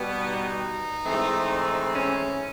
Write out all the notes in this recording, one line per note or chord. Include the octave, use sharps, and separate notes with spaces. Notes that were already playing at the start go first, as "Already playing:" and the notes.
Already playing: B2 G3 B3
D#4
G#2 E3 A3 C4
C#4